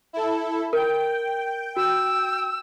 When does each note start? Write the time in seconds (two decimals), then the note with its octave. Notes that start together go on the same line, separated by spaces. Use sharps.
0.13 E4 A4
0.73 A#4 G5
1.76 F#4 E6